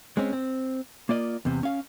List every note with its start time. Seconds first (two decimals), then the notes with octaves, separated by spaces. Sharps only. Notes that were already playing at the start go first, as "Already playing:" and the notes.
0.17 G#3 C4 C#4
0.33 C4
1.09 A#3 F4 D5 D#5
1.45 E2 C3
1.63 C#4 F5